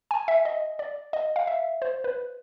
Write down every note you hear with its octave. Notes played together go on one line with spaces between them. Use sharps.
G#5
E5
D#5
D5
D#5
F5
E5
C5
B4